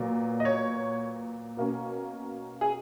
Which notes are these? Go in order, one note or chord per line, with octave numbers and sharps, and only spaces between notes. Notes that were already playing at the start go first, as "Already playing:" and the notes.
Already playing: A#2 F#3 B3
D#5
C#5
B2 A#3 C#4
G#4